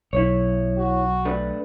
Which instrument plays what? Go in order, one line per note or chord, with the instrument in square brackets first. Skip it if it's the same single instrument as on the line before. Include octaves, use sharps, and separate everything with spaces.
[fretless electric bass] B1 [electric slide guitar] E4 C#5
[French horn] F#4
[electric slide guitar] A3 D4 B4